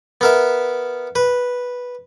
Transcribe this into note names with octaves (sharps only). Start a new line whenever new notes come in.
B3 A#4 E5
B4